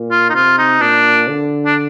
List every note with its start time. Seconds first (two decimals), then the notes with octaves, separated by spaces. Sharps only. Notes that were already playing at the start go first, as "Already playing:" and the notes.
Already playing: A#2
0.11 F4
0.29 D#4
0.34 C3 F4
0.58 D#4
0.81 A#2 D4
1.28 D3
1.65 D4